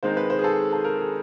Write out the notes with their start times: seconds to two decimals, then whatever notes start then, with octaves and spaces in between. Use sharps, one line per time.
0.03 D#3 G#3 C4 D#4 C5
0.17 B4
0.30 C5
0.39 G#4
0.44 A4
0.72 A4
0.84 A#4
0.98 G#4